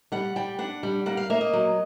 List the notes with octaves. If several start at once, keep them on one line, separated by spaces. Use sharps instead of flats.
G3 F#5
G3 G5
D4 F#5
G3
A#3 F#5
F5
A#3 E5
D#5
F#3